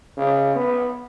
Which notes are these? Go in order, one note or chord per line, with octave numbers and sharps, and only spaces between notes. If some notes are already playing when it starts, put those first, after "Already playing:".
C#3
B3